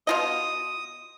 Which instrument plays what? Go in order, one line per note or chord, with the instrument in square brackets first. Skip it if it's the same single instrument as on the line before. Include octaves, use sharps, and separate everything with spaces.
[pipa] B2 F4 D#5 [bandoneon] D#6